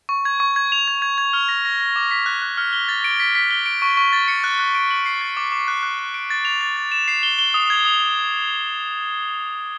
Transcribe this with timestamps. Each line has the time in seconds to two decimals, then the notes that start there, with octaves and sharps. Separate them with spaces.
0.09 C#6
0.25 G#6
0.40 C#6
0.56 G#6
0.72 F7
0.88 G#6
1.02 G#6
1.18 G#6
1.33 F6
1.49 A#6
1.65 A#6
1.80 A#6
1.96 D6
2.11 B6
2.26 F#6
2.42 F#6
2.58 F6
2.73 G7
2.89 A6
3.04 D7
3.20 B6
3.35 B6
3.51 G7
3.66 D7
3.82 C#6
3.97 C#6
4.13 A6
4.28 C#7
4.44 F#6
4.59 F#6
4.75 D7
4.91 F#7
5.06 C7
5.21 A6
5.37 D6
5.52 D6
5.68 F#6
5.83 F#6
5.99 F#6
6.14 D7
6.30 A6
6.45 F7
6.61 A6
6.77 A6
6.92 E7
7.08 C7
7.23 G7
7.39 G7
7.54 D#6
7.70 G#6
7.85 D#6